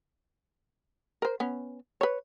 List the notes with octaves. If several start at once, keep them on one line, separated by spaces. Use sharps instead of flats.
A#4 C5
B3 C#4
B4 C#5